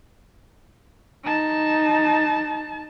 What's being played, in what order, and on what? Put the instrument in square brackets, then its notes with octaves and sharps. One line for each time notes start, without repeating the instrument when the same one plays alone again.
[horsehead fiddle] D#4 A5